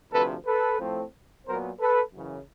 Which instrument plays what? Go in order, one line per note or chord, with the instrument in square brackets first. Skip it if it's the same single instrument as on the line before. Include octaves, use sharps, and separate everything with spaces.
[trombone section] D2 C3 F3 A4 B4
A4 B4
A2 F3 A3 C4
A#2 F#3 B3 A#4 C5
A4 B4
F#2 C#3 E3